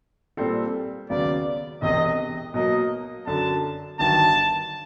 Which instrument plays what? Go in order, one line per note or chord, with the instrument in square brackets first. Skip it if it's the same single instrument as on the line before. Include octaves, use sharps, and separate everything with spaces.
[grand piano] A#2 G3 C4 F4 A4
[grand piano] D#2 C#3 F#3 B3 [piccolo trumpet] D5
[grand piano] E1 E2 C3 [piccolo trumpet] D#5
[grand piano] B2 F#3 A#3 [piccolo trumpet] D#5
[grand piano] F#2 D3 F#3 [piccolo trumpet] A5
[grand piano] G1 G2 D#3 F#3 [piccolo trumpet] A5